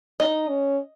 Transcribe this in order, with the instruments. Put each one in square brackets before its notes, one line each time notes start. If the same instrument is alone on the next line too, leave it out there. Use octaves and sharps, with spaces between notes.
[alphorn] D#4 [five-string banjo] D#5
[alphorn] C#4